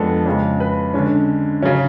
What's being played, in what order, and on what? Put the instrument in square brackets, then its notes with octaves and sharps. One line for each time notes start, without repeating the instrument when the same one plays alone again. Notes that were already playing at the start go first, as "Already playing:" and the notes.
Already playing: [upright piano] F2 F3 G#3 B3 D4 A4
F2 C#3 G#3
B4
D3 G#3 C#4
C#3 F#3 C#4